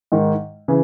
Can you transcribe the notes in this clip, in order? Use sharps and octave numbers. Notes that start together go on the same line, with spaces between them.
G#2 D#3
C#3 E3